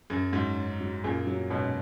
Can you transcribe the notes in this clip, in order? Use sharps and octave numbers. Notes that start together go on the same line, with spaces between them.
F#2 G#4
G#2 F#3
C#4
F#3
F#2 A#2 G#4
F#3
G#2 B2 C#4